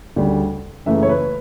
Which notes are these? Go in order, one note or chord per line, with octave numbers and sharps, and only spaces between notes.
D2 C#3 G3
F#1 F#2 C#3 E3 A3 E5
C#5
B4